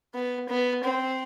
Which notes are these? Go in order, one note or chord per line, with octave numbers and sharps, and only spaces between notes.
B3
B3
C4